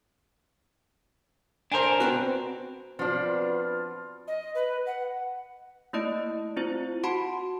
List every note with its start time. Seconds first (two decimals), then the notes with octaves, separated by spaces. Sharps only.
1.72 D4 A#4 C5 G#5
2.00 B3 C4 F#4
2.99 F3 B3 C4 D4 F4 F#4 B4
4.28 D#5
4.55 B4
4.86 F#5
5.93 A3 A#3 E4 D5 D#5 D7
6.56 C4 E4 F4 C5
7.03 F#4 F#5 A5 B5 C6 D7